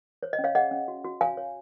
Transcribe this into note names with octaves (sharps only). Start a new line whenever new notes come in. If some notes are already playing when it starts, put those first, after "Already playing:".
C5 C#5
D#5
C#4
C#5 F5
G#4 D#5 F#5
C#4
F#4
F#4
C#5 F5 G#5
C#5